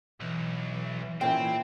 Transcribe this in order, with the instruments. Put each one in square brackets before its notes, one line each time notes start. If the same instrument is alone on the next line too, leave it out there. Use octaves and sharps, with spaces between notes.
[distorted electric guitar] B1 [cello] E3
[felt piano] A#2 C#4 E4 [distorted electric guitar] C4 [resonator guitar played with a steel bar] G5